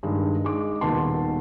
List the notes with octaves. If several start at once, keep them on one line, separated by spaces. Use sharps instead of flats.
G2 D#3 G#3
G#3 D#4 D6
D#1 B2 D#3 B4 A5 C6